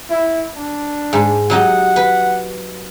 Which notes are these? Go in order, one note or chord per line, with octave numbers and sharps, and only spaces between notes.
E4
D4
G#2
F#3 D#4 G4 F#5
B4